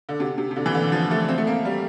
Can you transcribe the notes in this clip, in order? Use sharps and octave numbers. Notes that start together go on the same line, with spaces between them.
D3
C3
C3
C3
D3
E3
D3
F3
A3
C4
A3
A#3
G3